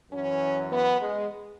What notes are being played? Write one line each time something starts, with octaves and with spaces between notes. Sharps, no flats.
F#2 E3 C#4
B3
G#3